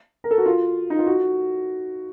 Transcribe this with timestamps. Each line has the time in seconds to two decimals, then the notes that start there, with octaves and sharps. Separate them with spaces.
0.24 A#4
0.31 A4
0.38 F#4
0.46 F4
0.90 D#4
0.99 F4
1.06 F#4